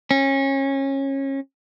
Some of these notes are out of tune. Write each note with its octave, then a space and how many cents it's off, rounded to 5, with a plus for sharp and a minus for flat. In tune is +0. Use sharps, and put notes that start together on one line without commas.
C#4 -25